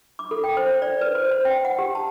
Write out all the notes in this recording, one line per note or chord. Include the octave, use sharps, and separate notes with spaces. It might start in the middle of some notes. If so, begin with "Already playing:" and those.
D6
A4
G5
C5
D5
B4
C5
C5
G5
F#5
G4
A5